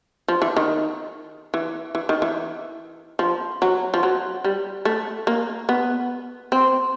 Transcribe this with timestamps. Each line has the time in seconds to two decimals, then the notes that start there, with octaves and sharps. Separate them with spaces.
0.28 F3
0.42 E3
0.57 D#3
1.54 E3
1.95 E3
2.09 D#3
2.22 E3
3.19 F3
3.62 F#3
3.94 F3
4.03 F#3
4.44 G3
4.85 A3
5.27 A#3
5.69 B3
6.52 C4